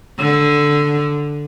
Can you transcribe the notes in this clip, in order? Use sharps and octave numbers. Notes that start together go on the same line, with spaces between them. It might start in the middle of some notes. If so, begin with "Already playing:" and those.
D3